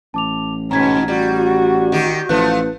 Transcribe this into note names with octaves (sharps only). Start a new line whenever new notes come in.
A1 A5 D6 F7
G#2 B2 C#4 A#5 G#6 B6
G3 F#4
D#3 G4
A1 F3 A3 E4 B4 F#6